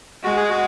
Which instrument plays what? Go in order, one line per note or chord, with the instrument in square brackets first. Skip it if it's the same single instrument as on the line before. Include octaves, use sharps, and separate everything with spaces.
[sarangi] G#3 [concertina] F#4
[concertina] G#4
F#4